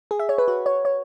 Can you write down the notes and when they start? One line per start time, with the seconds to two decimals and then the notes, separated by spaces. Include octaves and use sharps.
0.11 G#4
0.20 E5
0.29 C#5
0.38 B4
0.48 F#4
0.66 C#5
0.85 C#5